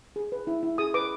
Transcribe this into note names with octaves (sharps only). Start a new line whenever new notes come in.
G#4
B4
E4
E4
G#4 D#6
B4 D6